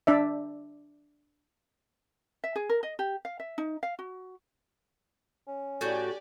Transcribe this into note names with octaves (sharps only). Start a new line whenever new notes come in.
D4 D5 E5
E5
G#4
A#4
D#5
G4
F5
E5
D#4
F5
F#4
C#4
A2 F#4 G4 D5 G5 G#5